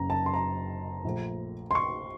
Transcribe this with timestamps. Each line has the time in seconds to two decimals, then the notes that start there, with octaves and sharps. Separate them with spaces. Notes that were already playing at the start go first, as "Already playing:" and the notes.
Already playing: F#1 F#2 C#3 A#5
0.10 A5
0.26 C6
0.34 A#5
1.04 A#1 A#2 A3
1.71 C6
1.75 C#6